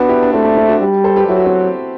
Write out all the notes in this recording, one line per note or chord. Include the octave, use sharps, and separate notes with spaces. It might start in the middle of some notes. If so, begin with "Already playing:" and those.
Already playing: B3 D4 F#4
E4 G4
D4
A3 C4 E4
D4
C4 E4
D4 F#4
G3
A4 C5
G4 B4
F#3 E4
F#4
C4 E4